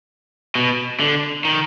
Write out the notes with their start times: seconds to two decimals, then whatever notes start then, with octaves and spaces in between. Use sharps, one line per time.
0.55 B2
1.00 D3
1.45 D#3